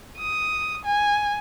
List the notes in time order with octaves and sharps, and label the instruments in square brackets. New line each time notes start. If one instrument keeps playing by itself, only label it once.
[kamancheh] D#6
G#5